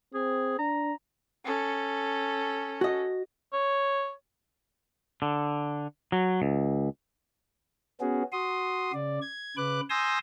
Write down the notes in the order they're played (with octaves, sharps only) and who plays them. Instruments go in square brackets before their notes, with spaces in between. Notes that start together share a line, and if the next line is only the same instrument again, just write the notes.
[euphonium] C4 [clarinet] G#4
[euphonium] D4 [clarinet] A#5
[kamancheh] C#4 A4
[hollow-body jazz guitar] F#4 D#5
[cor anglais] C#5
[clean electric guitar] D3
F#3
C#2
[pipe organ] B3 C#4 F#4 G#4
F#4 C6 D#6
C#3 D5
G#6
C#3 B4 D6 F#6
G#5 C6 D#6 E6 G6 A#6